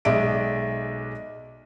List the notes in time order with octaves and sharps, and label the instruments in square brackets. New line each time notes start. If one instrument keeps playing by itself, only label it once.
[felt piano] B1 G#3 D5 E5 D7